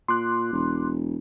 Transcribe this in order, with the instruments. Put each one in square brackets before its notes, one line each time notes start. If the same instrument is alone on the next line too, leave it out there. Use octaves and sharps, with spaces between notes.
[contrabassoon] A#2 [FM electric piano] C6 D6 F#6
[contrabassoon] E1